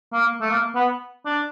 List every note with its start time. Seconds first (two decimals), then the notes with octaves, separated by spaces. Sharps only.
0.13 A#3
0.41 A3
0.51 A#3
0.75 B3
1.25 D4